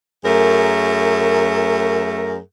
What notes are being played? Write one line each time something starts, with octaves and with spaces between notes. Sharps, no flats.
F#2 A3 G#4 A#4